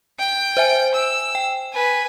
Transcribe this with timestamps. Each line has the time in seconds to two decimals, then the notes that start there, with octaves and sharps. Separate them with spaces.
0.19 G5
0.57 C5 E5 G#5
0.94 E6
1.35 G5
1.73 B4 G#5